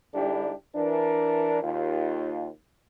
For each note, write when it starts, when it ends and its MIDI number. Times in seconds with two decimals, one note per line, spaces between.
0.14 0.51 44
0.14 0.51 50
0.14 0.51 55
0.14 0.51 62
0.14 0.51 64
0.14 0.51 67
0.75 1.57 52
0.75 1.57 62
0.75 1.57 70
1.63 2.46 39
1.63 2.46 65